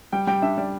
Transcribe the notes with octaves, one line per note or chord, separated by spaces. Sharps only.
G3 G5
G3 G5
D4 E5
G3 D5